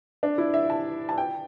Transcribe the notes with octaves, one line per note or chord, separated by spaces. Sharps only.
D4
E4
E5
A5
A5
G5